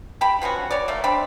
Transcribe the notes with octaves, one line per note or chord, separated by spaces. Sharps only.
G4 G5 A5 B5
F3 B3 C#4 F#4
F#4 C#5 D5
A3 A#3
C4 D4 B5